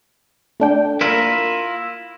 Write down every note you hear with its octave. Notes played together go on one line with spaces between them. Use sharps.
A3 D4 G5
A#3 E4 F4 A#4